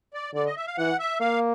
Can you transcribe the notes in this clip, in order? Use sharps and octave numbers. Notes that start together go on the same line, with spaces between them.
D5
D3 D5
D#5
E5
F5
E3 F#5
E5
A#3 F5